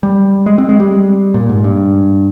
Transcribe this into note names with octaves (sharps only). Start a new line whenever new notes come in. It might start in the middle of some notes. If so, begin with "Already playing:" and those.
G3
G#3
C4
G#3
G3
A#2
G#2
G2